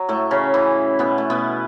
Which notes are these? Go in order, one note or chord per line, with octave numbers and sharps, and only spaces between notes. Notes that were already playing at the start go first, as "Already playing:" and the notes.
Already playing: F#3
A2 A3
C#3 C#4
E3 E4
B2 B3
A3
B2 B3